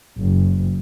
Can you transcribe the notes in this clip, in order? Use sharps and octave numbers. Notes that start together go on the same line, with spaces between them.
F#1